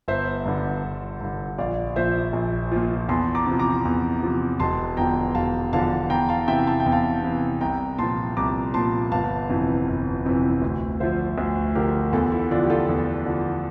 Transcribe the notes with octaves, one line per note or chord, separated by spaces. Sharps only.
G1 C5 E5
G2 D3
G1
G2 D3
A#1 D5 F5
A#2 F3 C5 E5
A#1
A#2 F3
E2 A5 C6
A#5 D6
C3 F3
A#5 D6
E2
C3 F3
E1 A5 C6
E2 D3 F3 G5 A#5
E1 F5 A5
E2 D3 F3 F5 A5
E2 G5 A#5
F5 A5
C3 E3 E5 G5
A5
G5
E2
F5 A5
C3 E3
C2 G5 A#5
A#2 F3 A5 C6
C2 A#5 D6
A#2 F3 A5 C6
G1 F5 A5
F2 C3 E3
G1
F2 C3 E3
D2
D3 F3 C5 E5
D2
D3 F3 G4 A#4
E2 F4 A4
E4
D3 F3 D4 F4
G4
F4 A4
E2
D3 F3